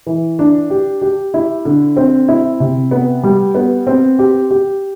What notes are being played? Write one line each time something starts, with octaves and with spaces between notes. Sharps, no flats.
E3
D4
G4
G4
E4
D3
C4
E4
C3
B3
G3
B3
C4
G4
G4